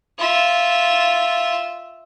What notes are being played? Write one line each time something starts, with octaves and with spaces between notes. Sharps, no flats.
F4 E5